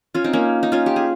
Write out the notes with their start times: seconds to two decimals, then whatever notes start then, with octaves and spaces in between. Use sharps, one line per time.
0.14 C#4 F4
0.24 C4 D#4
0.33 A#3 C#4
0.63 D#4
0.72 C#4 F4
0.86 G4
0.96 G#4